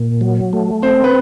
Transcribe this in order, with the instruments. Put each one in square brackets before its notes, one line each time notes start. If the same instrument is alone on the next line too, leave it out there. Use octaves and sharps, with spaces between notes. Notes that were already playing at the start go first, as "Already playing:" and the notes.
Already playing: [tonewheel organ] A#2
F#3
A3
[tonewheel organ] C4 [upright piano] C5
[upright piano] B4